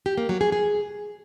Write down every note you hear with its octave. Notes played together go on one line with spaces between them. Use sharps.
G4
A#3
F#3
G#4
G#4